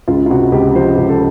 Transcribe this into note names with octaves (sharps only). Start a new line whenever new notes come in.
C#2 F4
F4
C3 F#4
C#2 G4
F3 C5
C#2 G4
A4